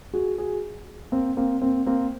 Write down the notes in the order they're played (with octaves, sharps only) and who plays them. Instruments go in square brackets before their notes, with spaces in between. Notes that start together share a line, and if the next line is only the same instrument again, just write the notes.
[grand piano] F#4 G#4
F#4 G#4
A#3 C4
A#3 C4
A#3 C4
A#3 C4